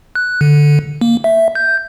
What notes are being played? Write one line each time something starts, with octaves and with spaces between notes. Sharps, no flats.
F#6
D3
A#3
E5
G6